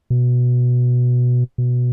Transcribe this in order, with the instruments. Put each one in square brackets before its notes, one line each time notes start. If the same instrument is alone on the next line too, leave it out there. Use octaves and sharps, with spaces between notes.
[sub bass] B2
B2